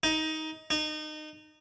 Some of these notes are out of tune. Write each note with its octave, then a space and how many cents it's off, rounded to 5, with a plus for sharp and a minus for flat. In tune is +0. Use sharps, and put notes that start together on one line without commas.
D#4 +15
D#4 -25